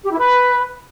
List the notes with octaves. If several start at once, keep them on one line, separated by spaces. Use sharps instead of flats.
G4
E4
B4